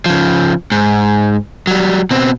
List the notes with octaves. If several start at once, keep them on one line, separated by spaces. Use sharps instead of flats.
C#3 F3
G#2
F#3 G3
B2 C4